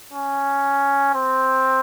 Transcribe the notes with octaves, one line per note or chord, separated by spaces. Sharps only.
C#4
C4